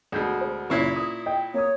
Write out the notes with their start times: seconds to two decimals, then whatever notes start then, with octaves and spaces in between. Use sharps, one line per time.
0.12 D2 B2 G#3 G6
0.40 G#3 C5
0.70 F#1 A#2 E4 C#5 C7
0.96 D#6
1.26 D#5 G5
1.54 A#3 C#5 D#6